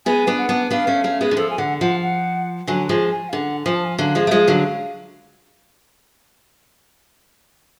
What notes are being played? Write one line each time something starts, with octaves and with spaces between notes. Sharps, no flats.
G#3 B3 G#5
B3 D4
F#5
B3 D4
B3 D4 F5
A3 C#4
A3 C#4
G#3 B3
D3
F3 A4
G#5
D3 F#5
F3 F#5
F#5
D3 F#3 G#5
F3 G#3 G#5
G#5
F5
D3 F#5
F3 G#5
A5
G#5
D3 F#3 F5
F3 G#3
A3
F3 G#3
D3 F#3